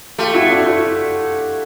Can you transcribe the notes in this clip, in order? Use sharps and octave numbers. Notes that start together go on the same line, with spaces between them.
A3 F4 G4
E4 F#4
D4 E4
D4 E4